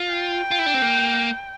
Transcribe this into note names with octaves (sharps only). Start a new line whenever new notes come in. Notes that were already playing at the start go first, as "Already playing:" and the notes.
Already playing: F4
G5
F4
E4
D4
C4
A#3